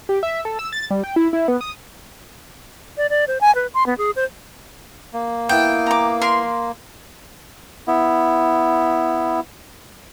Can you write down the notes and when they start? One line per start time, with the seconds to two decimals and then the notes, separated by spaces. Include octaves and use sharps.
0.09 G4
0.23 E5
0.45 A4
0.59 E6
0.73 A6
0.91 G3
1.04 G5
1.16 E4
1.33 E4
1.48 B3
1.61 D#6
2.97 D5
3.10 D5
3.27 C5
3.41 G#5
3.55 B4
3.74 C6
3.86 B3
3.98 G#4
4.16 C5
5.13 A#3
5.49 B3 E4 G5
5.86 A#5 D6
6.22 A#4 C6
7.87 B3 E4